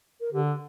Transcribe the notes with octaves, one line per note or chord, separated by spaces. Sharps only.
A#4
D3 G4